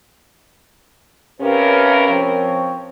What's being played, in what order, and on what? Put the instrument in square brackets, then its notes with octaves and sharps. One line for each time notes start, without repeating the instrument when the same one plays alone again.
[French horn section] C3 C#4 A#4 [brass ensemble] B4 F5
[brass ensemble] F3 C4 C#5